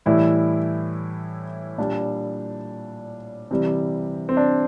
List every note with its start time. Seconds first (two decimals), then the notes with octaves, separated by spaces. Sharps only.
0.06 A2 E3 G3 E4
1.78 A#2 G3 D4
3.51 C3 E3 G3
4.29 C4
4.37 D4